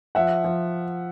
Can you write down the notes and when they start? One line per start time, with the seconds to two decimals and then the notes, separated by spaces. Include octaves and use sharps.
0.15 F3 E5 F#5
0.44 F3